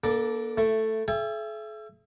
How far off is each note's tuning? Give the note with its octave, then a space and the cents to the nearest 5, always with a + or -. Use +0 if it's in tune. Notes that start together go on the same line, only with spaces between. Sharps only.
A#3 +30 D4 -10 A4 +0
A3 +0 E4 +20
A4 -45 E5 +30 G5 +45